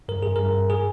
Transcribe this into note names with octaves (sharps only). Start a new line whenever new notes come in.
G2 A#4
G2 G#4
G2 A#4
G2
G#4